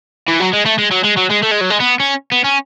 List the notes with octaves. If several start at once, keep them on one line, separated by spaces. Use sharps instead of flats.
E3
F#3
G#3
A3
G#3
F#3
G#3
F#3
G#3
A3
G#3
F#3
G#3
B3
C#4
B3
C#4